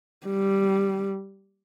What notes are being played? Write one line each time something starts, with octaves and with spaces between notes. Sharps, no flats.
G3